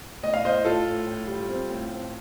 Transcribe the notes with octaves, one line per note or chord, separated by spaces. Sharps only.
A2 D#5
F5
A2 C5 D#5
A2 F4 A4
A2
A2
G3
C4
A2
C4